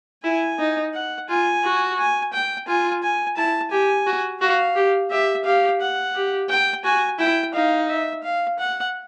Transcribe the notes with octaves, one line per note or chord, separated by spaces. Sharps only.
E4 G#5
D#4
F#5
F4 G#5
F#4
G#5
G5
F4 G#5
G#5
E4 A5
G4 G#5
F#4
F#4 F5
G4
G4 E5
G4 F5
F#5
G4
G5
F#4 G#5
E4 G5
D#4 F5
E5
F5
F#5